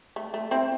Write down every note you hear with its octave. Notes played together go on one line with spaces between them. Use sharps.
A3
A3
C4 E4